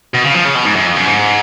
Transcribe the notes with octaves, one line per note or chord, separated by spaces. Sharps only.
B2
C#3
F3
C#3
B2
G#2
F#2
F2
F#2
G#2